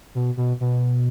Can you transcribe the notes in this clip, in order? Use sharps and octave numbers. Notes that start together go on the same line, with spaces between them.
B2
B2
B2